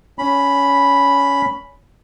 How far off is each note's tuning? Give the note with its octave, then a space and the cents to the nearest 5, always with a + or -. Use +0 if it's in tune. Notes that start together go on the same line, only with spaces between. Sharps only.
C#4 +15 B5 +0